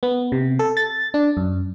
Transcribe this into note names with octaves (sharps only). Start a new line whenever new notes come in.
B3
C3
A4
A6
D4
F#2